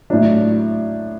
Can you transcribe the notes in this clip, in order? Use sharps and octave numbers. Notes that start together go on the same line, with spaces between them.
A2 F#3 D4